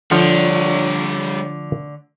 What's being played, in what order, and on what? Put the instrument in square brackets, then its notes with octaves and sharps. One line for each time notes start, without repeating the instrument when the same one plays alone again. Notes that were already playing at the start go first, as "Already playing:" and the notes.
[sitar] D3 A3 [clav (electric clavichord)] F3 A4 F#5 [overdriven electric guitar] G3 C#5